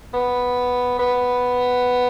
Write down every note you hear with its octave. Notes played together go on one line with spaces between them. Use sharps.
B3
B3